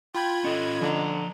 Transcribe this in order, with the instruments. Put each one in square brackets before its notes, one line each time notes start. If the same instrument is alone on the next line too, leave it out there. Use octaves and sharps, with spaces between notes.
[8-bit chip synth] F4 B5 G#6 [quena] G5
[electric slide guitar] C#4 A4 [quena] D#5
[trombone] D3 [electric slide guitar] F3 G#5 A#5